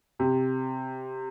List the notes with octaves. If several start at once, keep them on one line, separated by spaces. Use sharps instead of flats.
C3